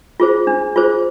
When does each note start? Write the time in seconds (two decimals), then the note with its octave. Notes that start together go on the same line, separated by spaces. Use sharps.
0.20 F4 G#4 C5
0.47 D4
0.76 F4 G#4 C5